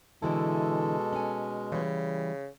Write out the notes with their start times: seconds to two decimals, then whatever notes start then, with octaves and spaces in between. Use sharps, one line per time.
0.22 B2 D3 E3 G#3 E4 A4
1.13 C#4 G#5
1.72 C#3 E3 G3